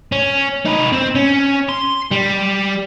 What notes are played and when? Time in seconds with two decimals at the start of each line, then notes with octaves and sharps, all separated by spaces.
0.12 C#4
0.65 D#4 B4
0.93 C4
1.15 C#4
1.69 C6
2.11 G3